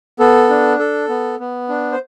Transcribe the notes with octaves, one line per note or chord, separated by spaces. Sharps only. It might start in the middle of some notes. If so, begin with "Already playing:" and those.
B3 A4
D4
A4
B3
B3
D4
C5